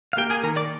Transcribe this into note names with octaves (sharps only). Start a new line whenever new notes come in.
F5
A#3 G4 G5
G#4 G#5
D#3 A#4 A#5
D5 D6